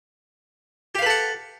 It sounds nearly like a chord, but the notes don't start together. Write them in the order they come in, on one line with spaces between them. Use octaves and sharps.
G4 F5 B4 A4 F#5